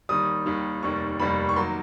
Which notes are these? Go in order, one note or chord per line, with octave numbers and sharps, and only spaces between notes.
D#2 D#3 G3 D#6
D#2 D#3 G3
F1 D#2 D#3 G3 C#6
F1 D#2 D#3 G3 B5
C#6
D#3 F#3 A#3 C6